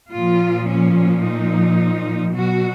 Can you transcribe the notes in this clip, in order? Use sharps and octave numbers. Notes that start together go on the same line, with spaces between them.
A#2 F3 F4
C#4
D#4
B2 F#3 F#4